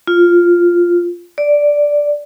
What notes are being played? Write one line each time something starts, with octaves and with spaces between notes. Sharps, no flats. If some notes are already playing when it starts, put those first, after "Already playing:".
F4
D5